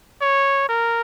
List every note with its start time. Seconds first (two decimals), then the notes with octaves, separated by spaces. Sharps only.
0.21 C#5
0.69 A#4